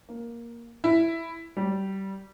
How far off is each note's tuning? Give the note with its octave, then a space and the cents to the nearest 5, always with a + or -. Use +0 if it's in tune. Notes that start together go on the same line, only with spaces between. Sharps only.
A#3 +10
E4 +5
G3 -20